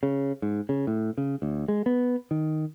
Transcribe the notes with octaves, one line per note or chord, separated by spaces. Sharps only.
C#3
G#2
C#3
A2
C#3
D2
G#3
B3
D#3